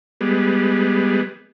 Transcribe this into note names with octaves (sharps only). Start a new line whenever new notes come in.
G3 G#3 B3